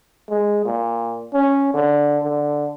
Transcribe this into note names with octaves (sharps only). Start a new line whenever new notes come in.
G#3
A#2
C#4
D3
D3